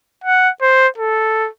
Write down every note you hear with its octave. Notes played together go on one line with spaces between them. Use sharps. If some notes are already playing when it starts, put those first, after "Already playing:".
F#5
C5
A4